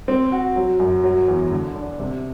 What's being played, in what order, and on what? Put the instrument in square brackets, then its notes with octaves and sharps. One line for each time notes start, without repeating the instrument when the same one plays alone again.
[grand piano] C4
F#4
F#3
F#2
F#3
E2
D3
D4
C3